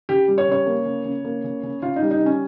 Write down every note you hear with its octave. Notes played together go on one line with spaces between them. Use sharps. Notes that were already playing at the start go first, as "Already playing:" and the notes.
C#3 G4
G3
C#5
C#3 C#5
A#3
C#3
C#3
A#3
C#3
C#3
C#3 F4
D#4
G3
D#4
C#3
C#4